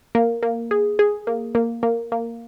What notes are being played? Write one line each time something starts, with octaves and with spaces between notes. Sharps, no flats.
A#3
A#3
G#4
G#4
A#3
A#3
A#3
A#3